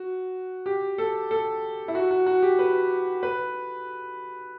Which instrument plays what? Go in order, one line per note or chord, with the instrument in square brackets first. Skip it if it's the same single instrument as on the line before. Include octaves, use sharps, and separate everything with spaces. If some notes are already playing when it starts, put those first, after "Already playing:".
Already playing: [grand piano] F#4
G4
A4
A4
E4
F#4
F#4
F#4
G4
B4
B4